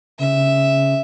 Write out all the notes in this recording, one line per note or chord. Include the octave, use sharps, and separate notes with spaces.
C#3 E5